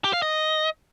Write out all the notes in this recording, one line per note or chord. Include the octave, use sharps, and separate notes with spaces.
G4
F5
D#5